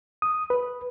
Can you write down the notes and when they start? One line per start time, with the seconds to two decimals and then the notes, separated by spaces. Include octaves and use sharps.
0.22 D#6
0.50 B4